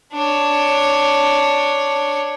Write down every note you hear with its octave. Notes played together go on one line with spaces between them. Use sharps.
D4 C#5